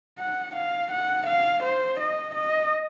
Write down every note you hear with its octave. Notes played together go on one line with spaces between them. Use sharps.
F#5
F5
F#5
F5
C5
D#5
D#5